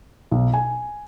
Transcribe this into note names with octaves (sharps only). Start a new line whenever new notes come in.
B1
G#5